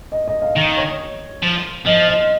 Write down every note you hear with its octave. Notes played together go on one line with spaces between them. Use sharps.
D#5
D#5
F5
D#3 D#5
C#5
F3
F3 D#5
D#5